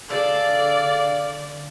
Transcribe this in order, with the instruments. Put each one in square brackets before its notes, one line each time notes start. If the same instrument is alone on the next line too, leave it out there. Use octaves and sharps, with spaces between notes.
[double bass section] D3 [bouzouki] G#4 A4 [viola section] D5 [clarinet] F5